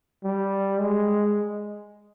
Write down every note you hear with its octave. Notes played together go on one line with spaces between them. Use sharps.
G3
G#3